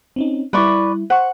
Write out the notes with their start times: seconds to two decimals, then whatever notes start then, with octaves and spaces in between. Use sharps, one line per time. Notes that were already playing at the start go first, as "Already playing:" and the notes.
0.16 C4 C#4 D#4
0.53 G3 E4 B4 D5 C#6
1.10 C5 F#5 C#6